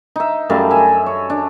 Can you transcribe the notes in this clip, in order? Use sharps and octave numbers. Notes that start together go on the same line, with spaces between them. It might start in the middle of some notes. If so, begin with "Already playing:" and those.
D#4 E5
F#2 G3 A3 F5
E5 G#5
C#5
D4